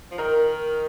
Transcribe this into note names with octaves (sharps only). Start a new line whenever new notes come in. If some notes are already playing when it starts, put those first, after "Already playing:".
F3
D#3 A#4